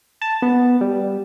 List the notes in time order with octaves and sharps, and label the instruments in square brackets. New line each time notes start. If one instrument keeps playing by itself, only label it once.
[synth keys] A5
B3
G3